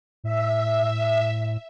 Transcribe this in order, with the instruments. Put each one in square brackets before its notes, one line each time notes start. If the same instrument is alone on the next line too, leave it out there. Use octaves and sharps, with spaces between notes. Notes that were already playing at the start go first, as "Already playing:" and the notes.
[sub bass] A2 [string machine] E5